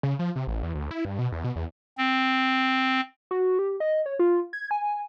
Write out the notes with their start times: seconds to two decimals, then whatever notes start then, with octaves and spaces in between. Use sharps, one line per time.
0.03 C#3
0.19 F3
0.36 C3
0.47 A1
0.63 E2
0.75 D2
0.91 E4
1.05 G2
1.19 B2
1.32 E2
1.44 B2
1.56 E2
1.98 C4
3.31 F#4
3.59 G4
3.80 D#5
4.06 C#5
4.19 F4
4.53 G#6
4.71 G#5